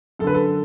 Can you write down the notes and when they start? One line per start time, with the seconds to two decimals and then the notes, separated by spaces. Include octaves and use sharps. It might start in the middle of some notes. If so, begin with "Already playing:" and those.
0.19 F#2 A4
0.24 D3 B4
0.34 A4